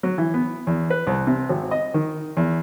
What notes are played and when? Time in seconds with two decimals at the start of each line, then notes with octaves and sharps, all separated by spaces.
0.03 F#3
0.18 E3
0.34 B3
0.67 E2
0.90 B4
1.07 C2
1.27 C3
1.49 G#1
1.71 D#5
1.94 D#3
2.37 E2